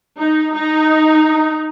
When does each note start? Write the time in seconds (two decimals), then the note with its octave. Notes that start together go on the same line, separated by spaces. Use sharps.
0.19 D#4
0.55 D#4